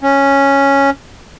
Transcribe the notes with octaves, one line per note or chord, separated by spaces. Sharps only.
C#4